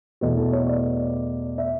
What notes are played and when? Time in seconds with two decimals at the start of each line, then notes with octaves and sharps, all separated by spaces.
0.21 E2 B2 A3 A4
0.37 A4
0.53 C#5
0.67 D5
1.58 E5